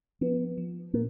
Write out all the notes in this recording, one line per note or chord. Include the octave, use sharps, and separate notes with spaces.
F3 B3
F3
A#2 A#3